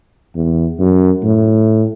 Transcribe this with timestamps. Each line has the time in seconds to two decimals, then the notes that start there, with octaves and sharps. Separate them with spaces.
0.35 E2
0.79 F#2
1.23 A2